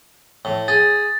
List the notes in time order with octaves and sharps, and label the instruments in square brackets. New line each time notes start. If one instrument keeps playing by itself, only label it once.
[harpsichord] A2
[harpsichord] G#4 [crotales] A6